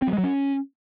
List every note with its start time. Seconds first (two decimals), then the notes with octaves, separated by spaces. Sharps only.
0.02 C4
0.08 F#3
0.13 G#3
0.18 F#3
0.24 C#4